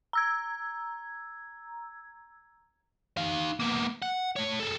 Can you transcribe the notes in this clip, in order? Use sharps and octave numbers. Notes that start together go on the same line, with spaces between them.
A#5 E6 G#6
D#4 F5
A#3 B3
F#5
A3 C#5
G#4 A4